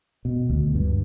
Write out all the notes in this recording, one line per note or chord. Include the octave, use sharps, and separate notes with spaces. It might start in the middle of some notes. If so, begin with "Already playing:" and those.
B2
D2
G2